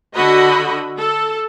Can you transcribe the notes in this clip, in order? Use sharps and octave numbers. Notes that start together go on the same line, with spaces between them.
D3 F#4 D#5 B5
A4